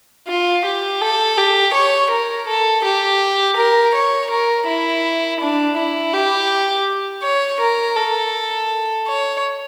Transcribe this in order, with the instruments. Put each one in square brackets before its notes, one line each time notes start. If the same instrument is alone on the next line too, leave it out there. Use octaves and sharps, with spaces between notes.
[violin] F4
G4
A4
G4
C#5
A#4
A4
G4
A#4
C#5
A#4
E4
D4
E4
G4
C#5
A#4
A4
C#5